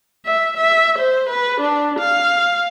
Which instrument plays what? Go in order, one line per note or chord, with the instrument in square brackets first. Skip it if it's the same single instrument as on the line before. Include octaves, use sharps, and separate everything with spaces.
[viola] E5
E5
C5
B4
D4
F5